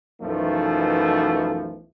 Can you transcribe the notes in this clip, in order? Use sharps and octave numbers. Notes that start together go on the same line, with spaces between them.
B1 F#2 E3 F3 A3 D#4